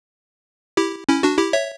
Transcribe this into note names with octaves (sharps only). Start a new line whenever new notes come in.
E4 G4
C#4 E4
D4 F#4
E4 G4
C#5 E5